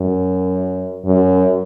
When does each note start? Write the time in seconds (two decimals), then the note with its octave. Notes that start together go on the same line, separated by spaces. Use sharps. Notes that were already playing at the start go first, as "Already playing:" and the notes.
Already playing: F#2
1.05 F#2